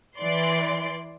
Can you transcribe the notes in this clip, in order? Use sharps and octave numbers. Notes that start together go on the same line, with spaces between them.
E3 D5 C6